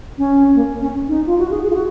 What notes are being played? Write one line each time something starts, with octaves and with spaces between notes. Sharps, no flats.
C#4
A#3
C#4
D#4
F4
F#4
G#4
G#4
F4
F#4